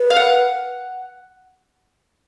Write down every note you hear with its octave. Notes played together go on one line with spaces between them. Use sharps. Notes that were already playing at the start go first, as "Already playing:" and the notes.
Already playing: B4
F5
F#5